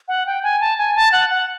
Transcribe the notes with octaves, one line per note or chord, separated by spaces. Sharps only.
F#5
G5
G#5
A5
G#5
A5
F#5
F#5